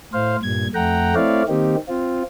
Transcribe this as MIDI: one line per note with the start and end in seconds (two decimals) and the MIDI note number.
0.13 0.36 45
0.13 0.36 72
0.13 0.36 77
0.43 0.67 43
0.43 0.67 46
0.43 0.67 92
0.75 1.15 41
0.75 1.15 57
0.75 1.15 78
0.75 1.15 79
0.75 1.15 82
1.15 1.43 57
1.15 1.43 60
1.15 1.43 64
1.15 1.43 73
1.15 1.43 74
1.15 1.43 77
1.49 1.76 51
1.49 1.76 58
1.49 1.76 60
1.49 1.76 63
1.49 1.76 67
1.89 2.23 60
1.89 2.23 65